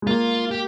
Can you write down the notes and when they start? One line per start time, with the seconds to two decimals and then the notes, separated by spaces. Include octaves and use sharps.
0.02 G#3
0.07 A#3 F4
0.51 G4